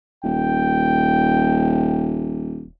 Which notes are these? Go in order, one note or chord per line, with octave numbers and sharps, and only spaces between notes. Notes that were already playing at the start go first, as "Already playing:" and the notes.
D#1 G5